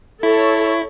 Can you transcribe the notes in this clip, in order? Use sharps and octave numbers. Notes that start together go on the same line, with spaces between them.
E4 A4 C#5